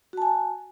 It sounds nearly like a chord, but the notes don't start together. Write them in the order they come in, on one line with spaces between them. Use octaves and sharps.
F#4 A5 G#5